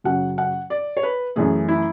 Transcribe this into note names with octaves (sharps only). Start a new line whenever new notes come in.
F#2 C#3 F#3 F#5
F#5
D5
C#5
B4
F#2 E3 A3 G#4
E4